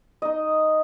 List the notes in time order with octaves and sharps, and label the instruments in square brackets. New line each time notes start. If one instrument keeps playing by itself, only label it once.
[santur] D#4 D#5